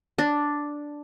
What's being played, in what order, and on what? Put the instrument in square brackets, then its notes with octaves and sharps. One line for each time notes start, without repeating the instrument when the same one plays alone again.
[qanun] D4